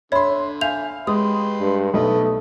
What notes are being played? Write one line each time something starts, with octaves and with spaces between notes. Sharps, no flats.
D3 C#5 E5 B5 C6
E5 F5 G#5 G6 F7
G#3 G4 B4 C6 D#6
G2
B1 A3 B4 D#5